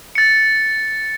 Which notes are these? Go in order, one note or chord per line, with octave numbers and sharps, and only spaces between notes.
A6 C#7